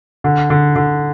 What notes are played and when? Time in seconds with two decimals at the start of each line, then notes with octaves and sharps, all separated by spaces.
0.24 D3
0.50 D3
0.76 D3